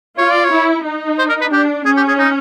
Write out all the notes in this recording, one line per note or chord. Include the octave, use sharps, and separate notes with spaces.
F4 C#5
D5
C#5
E4
D#4
C5
A#4
B4
D4 G4
C#4 G#4
G4
G#4
D#4